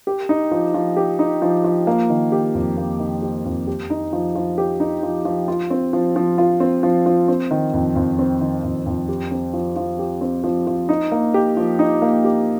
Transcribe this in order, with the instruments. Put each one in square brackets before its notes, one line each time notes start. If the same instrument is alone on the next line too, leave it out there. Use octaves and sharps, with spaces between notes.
[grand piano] G4
D#4
F3
F3
G4
D#4
F3
F3
A#3
D#3
G4
F2
A#3
D#3
G4
F2
G4
D#4
F3
F3
G4
D#4
F3
F3
F4
C4
F3
F3
F4
C4
F3
F3
C4
D#3
F2
F2
C4
D#3
F2
F2
G4
C4
F3
F3
G4
C4
F3
F3
D#4
A#3
G4
F3
D#4
A#3
G4